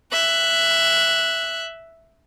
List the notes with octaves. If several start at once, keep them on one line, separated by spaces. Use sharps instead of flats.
E5 F#6